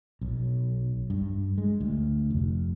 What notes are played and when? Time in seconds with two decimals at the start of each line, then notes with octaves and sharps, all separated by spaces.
0.21 B1
1.10 G2
1.58 G#3
1.80 D2
2.30 F1